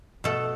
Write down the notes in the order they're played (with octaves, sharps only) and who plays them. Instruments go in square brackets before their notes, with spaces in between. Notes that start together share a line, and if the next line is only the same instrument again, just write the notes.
[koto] B2 A3 A4